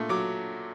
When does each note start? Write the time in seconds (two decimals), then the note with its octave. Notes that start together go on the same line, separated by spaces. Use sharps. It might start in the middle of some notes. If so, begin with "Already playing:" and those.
Already playing: A#2 A3
0.09 F#3 D6